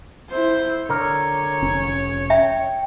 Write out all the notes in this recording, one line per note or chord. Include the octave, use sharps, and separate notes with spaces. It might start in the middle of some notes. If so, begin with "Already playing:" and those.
E4 C5
D3 A#4 C#5
F1 C#4
E5 G5